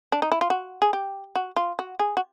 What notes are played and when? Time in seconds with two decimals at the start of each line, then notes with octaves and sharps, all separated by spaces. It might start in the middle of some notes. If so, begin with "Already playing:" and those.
0.12 D4
0.22 D#4
0.32 E4
0.41 F4
0.50 F#4
0.82 G#4
0.93 G4
1.35 F#4
1.56 F4
1.79 F#4
1.99 G#4
2.17 F#4